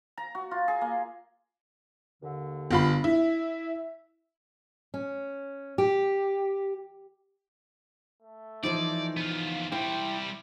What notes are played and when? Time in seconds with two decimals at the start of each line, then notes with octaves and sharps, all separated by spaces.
0.18 A#5
0.35 F#4
0.51 F4
0.68 G#4
0.81 A#3
2.23 D#2 D3
2.71 G1 F4 B5
3.04 E4 E5
4.94 C#4
5.78 G4
8.23 A3
8.63 E3 F3 D#4 D5
9.17 B3 F4
9.72 G3 E4 C5 G5